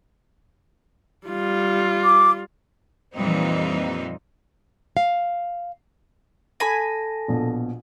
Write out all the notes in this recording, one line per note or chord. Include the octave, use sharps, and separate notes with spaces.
G3 F4
D6
F2 A#2 E3 G3 C4 D#4
F5
A4 G#5 A5 B5 A#6
A#1 B2